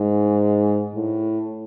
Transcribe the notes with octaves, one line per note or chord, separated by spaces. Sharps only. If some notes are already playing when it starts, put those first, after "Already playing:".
Already playing: G#2
A2